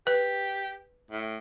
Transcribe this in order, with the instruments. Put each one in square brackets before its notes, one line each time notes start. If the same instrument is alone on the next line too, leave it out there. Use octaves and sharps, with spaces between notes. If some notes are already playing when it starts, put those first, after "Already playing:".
[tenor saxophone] G4 [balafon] B4
[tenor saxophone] A2